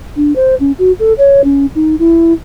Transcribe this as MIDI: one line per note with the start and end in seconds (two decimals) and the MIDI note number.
0.16 0.35 62
0.35 0.54 72
0.60 0.72 61
0.78 0.92 66
0.99 1.13 69
1.18 1.41 73
1.44 1.66 61
1.75 1.95 63
1.99 2.33 64